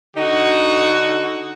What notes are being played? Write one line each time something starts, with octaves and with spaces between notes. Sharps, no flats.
D3 D#4 F#4